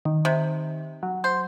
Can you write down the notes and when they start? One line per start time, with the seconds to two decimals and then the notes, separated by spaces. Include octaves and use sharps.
0.05 D#3
0.25 C3
1.03 F#3
1.24 C5